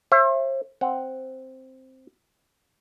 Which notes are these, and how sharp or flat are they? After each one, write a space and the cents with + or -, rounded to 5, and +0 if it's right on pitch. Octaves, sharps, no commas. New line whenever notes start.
C5 +40 E5 +25
C4 +0 F#5 +0